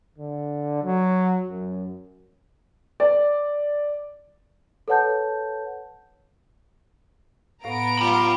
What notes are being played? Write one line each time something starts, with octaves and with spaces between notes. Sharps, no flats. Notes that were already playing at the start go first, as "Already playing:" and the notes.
D3
F#3
F#2
D5
A4 B4 C#5 F#5 A5 G6
A2 B3 F5 A#5 D7
F4 G5 B5